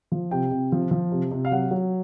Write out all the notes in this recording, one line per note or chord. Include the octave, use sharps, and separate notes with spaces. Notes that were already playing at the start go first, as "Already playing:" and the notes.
F3
C3 G5
C3
F3
F3
C3
C3
F5
F#3 F#5
F#3